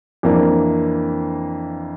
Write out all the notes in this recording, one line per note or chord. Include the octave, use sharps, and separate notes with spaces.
F2 E3 A#3 D4